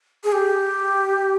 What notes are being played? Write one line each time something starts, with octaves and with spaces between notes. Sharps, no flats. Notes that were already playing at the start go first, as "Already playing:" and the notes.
G#4
G4